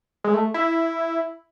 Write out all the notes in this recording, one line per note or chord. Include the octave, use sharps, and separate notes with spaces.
G#3
A3
E4